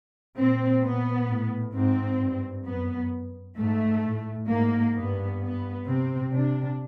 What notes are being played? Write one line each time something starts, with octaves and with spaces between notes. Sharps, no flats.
A#2 C4
A#2 B3
A2
G#2 C4
G2
F#2 B3
G#2 A3
A2
G#2 A#3
G2 B3
B3
C3 C4
C3 D4